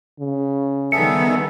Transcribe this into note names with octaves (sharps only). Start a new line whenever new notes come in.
C#3
D#3 G3 B3 G#4 A4 E5 C#7